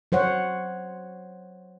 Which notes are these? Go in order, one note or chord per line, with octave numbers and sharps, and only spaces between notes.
F#3 C5 C#5 F#5